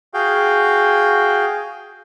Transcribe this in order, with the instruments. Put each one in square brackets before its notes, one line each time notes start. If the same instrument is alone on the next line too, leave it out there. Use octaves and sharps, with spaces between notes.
[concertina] F#4 G#4 F5 G5